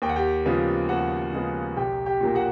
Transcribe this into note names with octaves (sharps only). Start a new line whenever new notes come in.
D#2 G5
F#5
G4 G5
C#3 F3 G#3 B3
D#2 F#4 F#5
C#3 F3 G#3 B3
B1 G4 G5
G4 G5
A#2 F#3 A#3
F#4 F#5